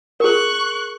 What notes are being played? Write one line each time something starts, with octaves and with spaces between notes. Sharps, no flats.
G#4 A#4 C#6 F#6